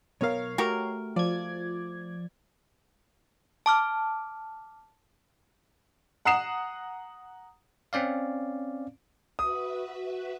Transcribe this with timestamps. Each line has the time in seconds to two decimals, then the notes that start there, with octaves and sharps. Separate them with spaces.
0.21 B1 B3 A#4 C#5 F5
0.58 A3 F#4 G4 A#4 G5
1.16 F3 D5 G#6
3.66 A5 D6 F6
6.25 F#5 A#5 D#6 C7 E7
7.93 C4 C#4 D5 F5
9.39 F#4 B4 E5 D#6